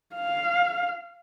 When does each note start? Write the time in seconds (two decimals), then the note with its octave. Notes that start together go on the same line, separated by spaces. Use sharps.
0.15 F5